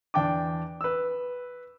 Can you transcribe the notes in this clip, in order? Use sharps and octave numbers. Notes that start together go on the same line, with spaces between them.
E2 D4 G5 A5 D6
B4 E6